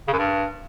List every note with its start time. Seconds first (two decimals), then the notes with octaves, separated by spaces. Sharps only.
0.08 C#3
0.13 F#2
0.18 G2